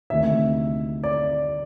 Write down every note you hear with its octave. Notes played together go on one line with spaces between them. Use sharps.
D2 C3 D#3 E5
D5